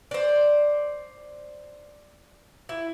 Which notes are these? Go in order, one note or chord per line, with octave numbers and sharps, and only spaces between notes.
C5 D5
E4